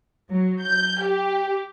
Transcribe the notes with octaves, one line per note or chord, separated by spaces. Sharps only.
F#3
G6
G4